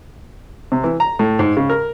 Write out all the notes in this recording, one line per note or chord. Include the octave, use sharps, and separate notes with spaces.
C3
E3
A#5
A2
G#2
C#3
A#4